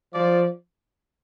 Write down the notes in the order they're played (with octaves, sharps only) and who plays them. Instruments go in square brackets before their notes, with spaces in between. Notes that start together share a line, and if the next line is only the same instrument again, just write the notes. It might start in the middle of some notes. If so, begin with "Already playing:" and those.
[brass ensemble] F3 [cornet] D5